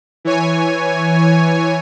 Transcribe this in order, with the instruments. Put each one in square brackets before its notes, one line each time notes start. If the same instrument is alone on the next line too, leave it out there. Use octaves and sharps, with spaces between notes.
[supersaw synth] E3 C#5 G#5